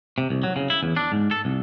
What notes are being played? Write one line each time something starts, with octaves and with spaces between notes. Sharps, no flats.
C3
C2
F#3
C#3
E4
E2
D4
G#2
A4
C2